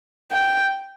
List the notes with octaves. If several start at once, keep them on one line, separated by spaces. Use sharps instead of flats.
G5